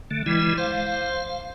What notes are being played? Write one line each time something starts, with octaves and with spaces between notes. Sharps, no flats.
D3 A3
E3 G3 G#3 E4
C5 F5